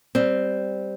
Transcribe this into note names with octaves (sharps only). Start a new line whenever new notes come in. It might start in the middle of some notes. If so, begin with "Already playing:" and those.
G3 C4